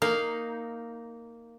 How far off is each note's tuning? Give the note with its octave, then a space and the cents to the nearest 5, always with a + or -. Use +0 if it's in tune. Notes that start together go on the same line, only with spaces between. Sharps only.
A#3 -5 D#4 +0 F5 +0